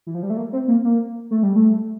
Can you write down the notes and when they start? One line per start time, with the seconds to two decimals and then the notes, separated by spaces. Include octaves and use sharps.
0.07 E3
0.14 F3
0.23 G3
0.30 A3
0.37 A#3
0.53 C4
0.68 A#3
0.84 A#3
1.31 A3
1.43 G3
1.56 A3